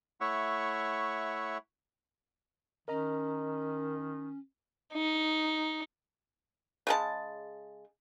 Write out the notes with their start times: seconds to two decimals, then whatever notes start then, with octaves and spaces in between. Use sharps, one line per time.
0.21 A3 E4 C#5 E5 F#5 C#6
2.88 D#3 C#4 A#4 D#5 A#5
4.93 D#4
6.87 C#3 G#3 A5